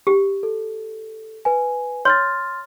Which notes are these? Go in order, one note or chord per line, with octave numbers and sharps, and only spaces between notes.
G4
A4
B4 G#5
C#5 C6 F6 A6